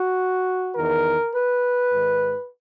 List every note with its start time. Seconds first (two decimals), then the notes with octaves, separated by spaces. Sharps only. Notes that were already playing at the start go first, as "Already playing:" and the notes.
Already playing: F#4
0.75 E2 D#3 A#4
1.34 B4
1.92 G#2 D#3